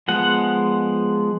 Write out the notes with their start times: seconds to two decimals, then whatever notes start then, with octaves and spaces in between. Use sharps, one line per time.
0.08 F3 G#3 B3 F#5